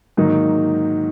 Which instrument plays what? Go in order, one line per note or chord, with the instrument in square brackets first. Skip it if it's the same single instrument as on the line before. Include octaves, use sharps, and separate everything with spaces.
[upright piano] G#2 D#3 F#3 A#3 D#4